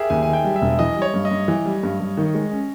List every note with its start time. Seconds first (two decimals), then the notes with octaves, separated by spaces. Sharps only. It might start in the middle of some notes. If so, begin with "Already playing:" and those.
Already playing: G4 G#4 A#4 E5
0.10 D#2 G#5
0.23 D#3 G#5
0.33 G5
0.44 G3
0.56 E5
0.62 E1
0.79 E3 D#5
0.96 G3
1.02 C#5
1.14 G2
1.25 D#5
1.31 G2
1.48 E3
1.65 G3
1.83 G2
2.00 G2
2.17 D#3
2.34 G#3
2.52 C#4